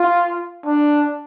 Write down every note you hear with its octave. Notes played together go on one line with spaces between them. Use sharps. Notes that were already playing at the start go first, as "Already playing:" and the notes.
Already playing: F4
D4